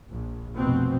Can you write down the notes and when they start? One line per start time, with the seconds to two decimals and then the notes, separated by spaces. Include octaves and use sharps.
0.10 A#1
0.55 F1 B2 C4